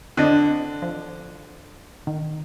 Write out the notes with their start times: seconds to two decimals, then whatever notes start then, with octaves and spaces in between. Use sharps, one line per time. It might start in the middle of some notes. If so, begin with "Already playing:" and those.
0.17 D3 C4 D5 D#5
0.82 F3
2.07 D#3